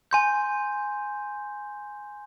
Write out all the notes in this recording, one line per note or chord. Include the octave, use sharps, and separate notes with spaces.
G#5 C6 G6